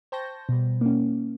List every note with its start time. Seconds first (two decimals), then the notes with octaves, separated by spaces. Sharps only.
0.12 C5 G5 A5 C#6 G6 A#6
0.49 B2 G3
0.81 A#3 C#4